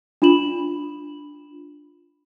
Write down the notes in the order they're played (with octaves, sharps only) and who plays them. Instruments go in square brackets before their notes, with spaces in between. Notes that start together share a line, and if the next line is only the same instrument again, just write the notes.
[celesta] D4 F4 B5 E7 F#7